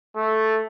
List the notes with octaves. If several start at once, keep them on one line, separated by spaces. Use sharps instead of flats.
A3